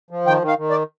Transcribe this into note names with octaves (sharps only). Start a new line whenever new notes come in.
F3
D#3 G5
D#3
F5
D#3
D5